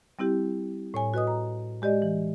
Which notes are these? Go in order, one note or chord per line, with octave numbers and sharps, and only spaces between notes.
G3 C4 E4 G4
A2 C#5 G#5
F#4 B4 D#5 D#6
A#5
G#3 G4 D5 D#5
E3